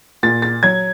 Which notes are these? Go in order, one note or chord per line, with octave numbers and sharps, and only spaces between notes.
A#2 A6
A6
F#3 G#6